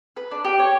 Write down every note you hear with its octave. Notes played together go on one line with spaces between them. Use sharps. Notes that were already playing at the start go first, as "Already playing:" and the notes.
B4
D4
G4
C#5